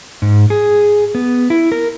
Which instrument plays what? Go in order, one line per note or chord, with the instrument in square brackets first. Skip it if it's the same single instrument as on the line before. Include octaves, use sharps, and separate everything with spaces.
[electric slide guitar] G#2
G#4
B3
E4
A#4